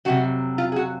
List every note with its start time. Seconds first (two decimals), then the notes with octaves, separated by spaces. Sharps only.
0.05 F2 C3 F#3 F#4
0.58 F4
0.72 G#4
0.76 F#4